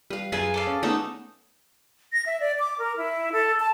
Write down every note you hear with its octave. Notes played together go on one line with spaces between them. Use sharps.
G3 B4 F5
F#2 F4 G#4 A#4 B4 E5 G#5
A4 D5 F5
C#4
A3 B3 C#4 D#4 E6
A#6
E5
D5
D6
A#4
E4
A4
A5